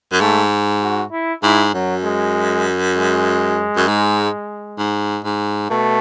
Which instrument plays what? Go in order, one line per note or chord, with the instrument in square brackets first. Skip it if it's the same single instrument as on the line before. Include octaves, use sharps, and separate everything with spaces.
[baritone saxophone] F#2
[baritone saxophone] G#2 [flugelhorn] A3
[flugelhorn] F#4
E4
[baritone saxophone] G#2 [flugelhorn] E4
[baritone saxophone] F#2 [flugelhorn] F#3
[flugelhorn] G#3
G#3
[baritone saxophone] F#2
G#2
G#2
G#2
[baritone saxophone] B2 [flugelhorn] A3